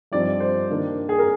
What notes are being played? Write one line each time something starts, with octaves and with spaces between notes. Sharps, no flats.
G2 F3 C4 D#4 D5
C5
D#3 A#3 D4
G#4
A#4